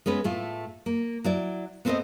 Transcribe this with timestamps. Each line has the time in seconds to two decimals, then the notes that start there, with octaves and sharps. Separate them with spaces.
0.06 G#3 B3 C#4 B4
0.24 A2 A3 F4
0.86 A#3
1.24 F#3 E4 D5
1.85 B3 C4 A4 B4 C5 D#5